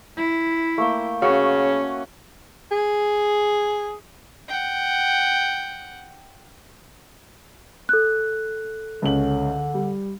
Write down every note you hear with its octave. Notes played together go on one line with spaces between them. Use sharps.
E4
A3 A#3 G5
C#3 C#4 F#4
G#4
F#5 G5
A4 F#6
C#2 D3 C#4 F#7
G3